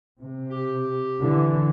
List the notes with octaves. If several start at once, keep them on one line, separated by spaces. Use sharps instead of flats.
C3
G4
D3 E3